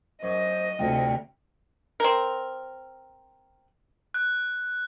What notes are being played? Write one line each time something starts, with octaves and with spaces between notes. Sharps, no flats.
F#2 C5 D#5
D2 C3 F4 G5
C4 A#4
F#6